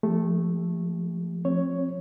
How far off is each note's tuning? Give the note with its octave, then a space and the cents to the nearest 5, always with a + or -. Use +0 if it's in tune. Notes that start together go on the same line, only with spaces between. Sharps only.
F3 -25 A3 +0 G4 +35
F3 +0 C4 +30 C#5 +0